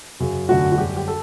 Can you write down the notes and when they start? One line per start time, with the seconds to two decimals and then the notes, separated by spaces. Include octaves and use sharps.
0.20 F#2 C#3 F#3
0.49 G1 F#2 D3 A3 F#4
0.72 F#4
0.78 F#2 D3 G3 G4
0.96 G4
1.08 A4